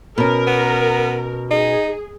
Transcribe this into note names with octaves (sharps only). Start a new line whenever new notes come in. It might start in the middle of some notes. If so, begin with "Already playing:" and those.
B2 C#4 A#4
B3
D#4 G#4